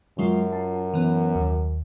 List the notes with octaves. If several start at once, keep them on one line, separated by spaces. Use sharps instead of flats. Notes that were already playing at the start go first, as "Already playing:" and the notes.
F#2 F#3 G#3 F4
F4 A5
E3 B3
D#2